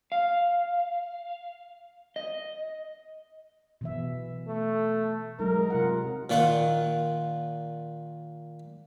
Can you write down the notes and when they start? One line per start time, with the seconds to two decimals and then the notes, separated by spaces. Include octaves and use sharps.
0.12 F5
2.16 D#5
3.81 B2 E3 E5
4.47 A3
5.39 F#3 G#3 D#4 A#4
5.70 C3 F4 F#5
6.30 A#2 D#3 F4 F#5